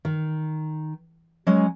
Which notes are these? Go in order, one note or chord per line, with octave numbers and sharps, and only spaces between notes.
D#3
F#3 G#3 C#4 G#5